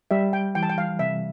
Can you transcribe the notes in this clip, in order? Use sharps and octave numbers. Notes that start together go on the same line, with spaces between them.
G3 E5
G5
E3 G5
A5
G5
F5
C3 E5